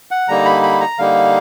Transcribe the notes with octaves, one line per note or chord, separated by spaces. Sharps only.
F#5
D3 G3 A#3 D#4 A#5
B5
B5
A#5
D3 G3 A#3 D#4 F5